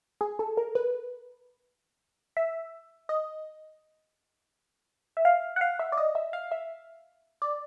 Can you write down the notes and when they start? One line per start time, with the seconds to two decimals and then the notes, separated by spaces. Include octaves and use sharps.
0.21 G#4
0.39 A4
0.57 A#4
0.75 B4
2.37 E5
3.09 D#5
5.17 E5
5.25 F5
5.56 F#5
5.61 F5
5.79 E5
5.92 D5
5.97 D#5
6.15 E5
6.33 F5
6.52 E5
7.42 D5